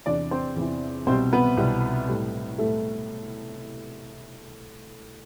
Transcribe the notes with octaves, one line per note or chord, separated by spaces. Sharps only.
E2 C3 E3 D4 D5
C4 C5
E2 C3 E3
C2 B2 G3 C4 C5
B3 B4
C2 B2 G3
A2 G3
A2 G3 A3 A4